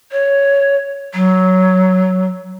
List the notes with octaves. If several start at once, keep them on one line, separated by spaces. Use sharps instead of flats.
C#5
F#3